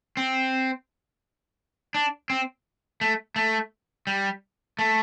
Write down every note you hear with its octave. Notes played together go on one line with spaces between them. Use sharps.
C4
D4
C4
A3
A3
G3
A3